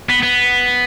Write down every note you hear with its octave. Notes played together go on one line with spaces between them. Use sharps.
B3
B3